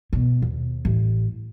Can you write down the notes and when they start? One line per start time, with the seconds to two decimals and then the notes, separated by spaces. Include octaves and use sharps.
0.13 B2
0.42 D#2
0.85 A1